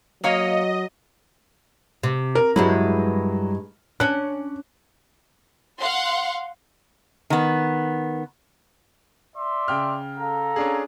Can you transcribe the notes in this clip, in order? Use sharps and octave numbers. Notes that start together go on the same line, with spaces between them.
F#3 A#3 C#5 D#5 F5
C3
A#4
G2 F#3 G#3 E4
C#4 D4 F#6
F5 F#5 C6
D#3 B3
D5 E5 C6
C#3 G5 F6
A4 F5 A#5
C#4 D4 G#4